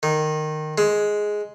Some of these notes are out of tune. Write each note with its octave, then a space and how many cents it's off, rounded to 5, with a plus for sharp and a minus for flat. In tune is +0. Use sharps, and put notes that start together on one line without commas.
D#3 -15
G#3 +5